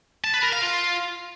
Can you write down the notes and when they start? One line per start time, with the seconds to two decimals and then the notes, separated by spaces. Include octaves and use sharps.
0.24 A5
0.34 B4
0.43 A#4
0.53 F5
0.62 F4